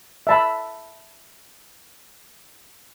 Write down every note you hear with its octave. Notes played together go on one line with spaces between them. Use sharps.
E5 A5 B5